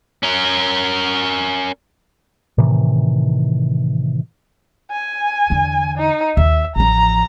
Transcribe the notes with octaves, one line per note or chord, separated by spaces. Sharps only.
C#4 A#4
A2 C3 D#3 E3
G#5
E2 D3
D#4
D#2 E5
A1 F3 A#5